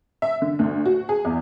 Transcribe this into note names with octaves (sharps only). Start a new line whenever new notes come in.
E5
D3
D2
F#4
G#4
E2